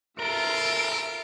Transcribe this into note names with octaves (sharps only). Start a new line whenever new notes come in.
F4 A4 A#4 E5 D7